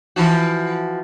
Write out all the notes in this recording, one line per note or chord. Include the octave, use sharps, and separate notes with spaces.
E3 F3 F#4